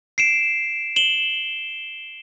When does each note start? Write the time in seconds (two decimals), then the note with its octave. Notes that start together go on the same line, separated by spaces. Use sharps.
0.18 C7 D7 E7
0.96 E7 F#7 G7